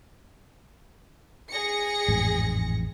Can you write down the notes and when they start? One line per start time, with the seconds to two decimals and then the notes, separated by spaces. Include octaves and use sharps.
1.51 G#4 A#6 C#7
2.08 A1 F2 G#2